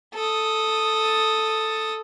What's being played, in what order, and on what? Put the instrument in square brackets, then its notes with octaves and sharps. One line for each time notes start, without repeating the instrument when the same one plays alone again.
[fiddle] A4 D#6